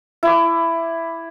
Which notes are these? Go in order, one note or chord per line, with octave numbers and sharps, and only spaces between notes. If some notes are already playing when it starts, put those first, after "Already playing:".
E4 D6